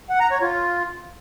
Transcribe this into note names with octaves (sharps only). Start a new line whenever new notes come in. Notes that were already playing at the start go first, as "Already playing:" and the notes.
F#5
A#5
C#5
F4